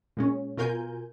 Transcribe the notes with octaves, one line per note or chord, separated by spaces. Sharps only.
A#2 G#3 C#4
B2 F4 A#4 G#5 G6